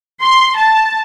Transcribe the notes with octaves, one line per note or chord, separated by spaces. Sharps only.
C6
A5